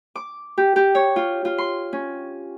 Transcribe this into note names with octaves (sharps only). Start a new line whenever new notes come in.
D6
G4
G4
C#5
F4
F4
C6
C#4